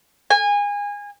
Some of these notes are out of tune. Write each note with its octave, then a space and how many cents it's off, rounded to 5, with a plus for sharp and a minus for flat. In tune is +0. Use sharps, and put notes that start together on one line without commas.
G#5 -25